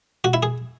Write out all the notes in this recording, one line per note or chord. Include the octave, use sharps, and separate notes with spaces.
F#4
E4
G#4